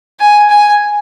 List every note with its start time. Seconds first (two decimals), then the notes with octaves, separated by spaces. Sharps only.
0.20 G#5
0.50 G#5